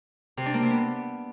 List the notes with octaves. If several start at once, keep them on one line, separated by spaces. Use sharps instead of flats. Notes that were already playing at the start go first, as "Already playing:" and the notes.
C3
D4
A#3
C3
B3